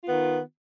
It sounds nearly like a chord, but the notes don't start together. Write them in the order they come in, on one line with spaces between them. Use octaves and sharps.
F4 B3 D#3